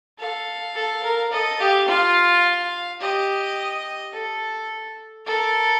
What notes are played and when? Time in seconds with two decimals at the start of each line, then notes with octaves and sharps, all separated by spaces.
0.19 A4 F5
0.75 A4
1.04 A#4
1.32 A4 D#5
1.60 G4 F5
1.89 F4 F5
3.00 G4 D#5
4.13 A4
5.27 A4 A#4